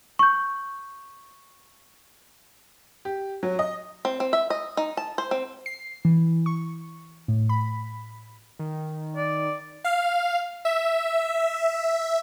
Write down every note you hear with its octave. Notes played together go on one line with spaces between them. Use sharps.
C#6 G6
G4
F#3
D#5
C4
C4
E5
D#5
D#4
A5
C5
C4
C7
E3
C#6
A2
B5
D#3
D5
F5
E5